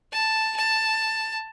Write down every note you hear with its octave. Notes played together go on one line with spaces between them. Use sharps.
A5
A5